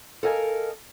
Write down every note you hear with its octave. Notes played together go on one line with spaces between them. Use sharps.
A4 A#4 D#5 F5 G#5